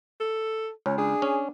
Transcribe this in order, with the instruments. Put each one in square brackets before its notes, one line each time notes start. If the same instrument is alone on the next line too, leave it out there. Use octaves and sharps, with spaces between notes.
[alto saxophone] A4
[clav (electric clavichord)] C#2 [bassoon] C#4
[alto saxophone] D4 [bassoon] G#4
[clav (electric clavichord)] C#4